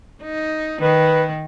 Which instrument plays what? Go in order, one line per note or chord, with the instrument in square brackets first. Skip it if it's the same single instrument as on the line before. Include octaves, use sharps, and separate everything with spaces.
[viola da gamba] D#4
[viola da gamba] D#3 [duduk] B4